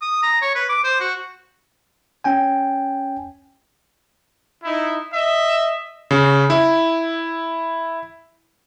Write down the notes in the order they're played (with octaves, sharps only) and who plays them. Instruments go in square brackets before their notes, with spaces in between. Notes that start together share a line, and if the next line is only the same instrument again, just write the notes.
[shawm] D#6
A#5
C#5
B4
D6
C5
F#4
[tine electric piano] C#4 G5 G#5
[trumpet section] D#4 E4
D#5 E5
[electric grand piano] C#3
E4